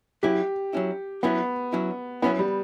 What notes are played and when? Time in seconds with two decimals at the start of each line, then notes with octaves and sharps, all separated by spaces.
0.23 F#3 C#4 E4 G4
0.73 F#3 C#4 E4
1.23 F#3 B3 C#4 E4
1.73 F#3 C#4 E4
2.22 F#3 B3 C#4 E4
2.39 G3